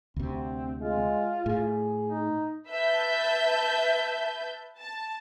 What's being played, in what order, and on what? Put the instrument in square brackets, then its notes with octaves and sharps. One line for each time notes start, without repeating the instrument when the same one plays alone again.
[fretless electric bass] D2 C3 [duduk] C4
[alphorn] G#3 [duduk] F4
[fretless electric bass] A2 [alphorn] G#4
[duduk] D#4
[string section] B4 E5 A5 G6
A5